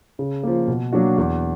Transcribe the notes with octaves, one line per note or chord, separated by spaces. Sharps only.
C#3
F3 A#3
B2
F#3 A#3 D4 F#4
E2